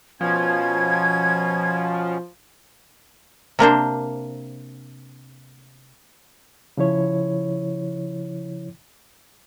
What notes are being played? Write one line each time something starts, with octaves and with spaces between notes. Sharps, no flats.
B2 F3 B3 C#4 G#6
C3 A#3 D4 C5
C#3 F3 E4 C#5